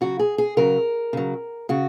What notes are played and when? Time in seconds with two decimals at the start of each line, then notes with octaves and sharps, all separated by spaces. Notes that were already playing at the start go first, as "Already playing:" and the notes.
0.01 C#3 F#3 F#4
0.19 G#4
0.38 G#4
0.57 C#3 F#3 A#4
1.13 C#3 F#3
1.69 C#3 F#4